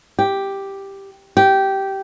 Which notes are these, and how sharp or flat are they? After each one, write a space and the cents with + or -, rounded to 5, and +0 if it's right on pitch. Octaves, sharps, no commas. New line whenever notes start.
G4 +0
G4 -15